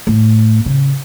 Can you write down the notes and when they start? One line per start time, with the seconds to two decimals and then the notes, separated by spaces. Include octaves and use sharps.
0.07 A2
0.66 C#3